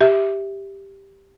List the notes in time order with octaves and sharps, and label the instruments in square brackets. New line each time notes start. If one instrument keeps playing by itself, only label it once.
[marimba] G4 E5